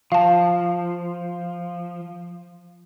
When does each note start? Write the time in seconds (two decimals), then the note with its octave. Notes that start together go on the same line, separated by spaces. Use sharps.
0.12 F3 F5 A5